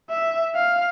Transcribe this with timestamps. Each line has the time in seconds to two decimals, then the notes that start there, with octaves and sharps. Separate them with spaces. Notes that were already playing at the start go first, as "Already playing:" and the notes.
0.10 E5
0.55 F5